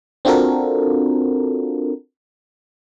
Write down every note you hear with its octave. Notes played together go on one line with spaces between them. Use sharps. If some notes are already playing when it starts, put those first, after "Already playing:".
C4 D4 F4 F#4 A4 A#4